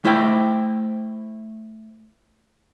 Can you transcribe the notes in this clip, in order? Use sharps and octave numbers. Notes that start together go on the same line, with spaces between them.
A3 E4 C5 G5